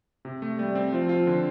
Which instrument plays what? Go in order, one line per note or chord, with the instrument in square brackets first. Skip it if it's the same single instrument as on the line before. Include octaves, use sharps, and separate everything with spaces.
[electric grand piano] C3
A3
[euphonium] G3 [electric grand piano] A3
[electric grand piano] C4
[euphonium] F3 [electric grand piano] F4
[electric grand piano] F4
D3